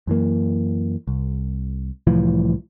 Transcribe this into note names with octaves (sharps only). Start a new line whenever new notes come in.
F#2 E3 A#3
C2
C2 A2 E3 F3